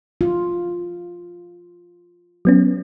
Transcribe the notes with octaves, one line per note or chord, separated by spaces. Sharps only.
F4
F#3 B3 C#4